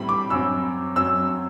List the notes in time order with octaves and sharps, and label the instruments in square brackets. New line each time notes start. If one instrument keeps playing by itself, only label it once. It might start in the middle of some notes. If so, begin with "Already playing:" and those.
Already playing: [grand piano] A2 E3 G3 C4 B5
D6
F#2 F#3 C4 E6
F#2 F#3 C4 E6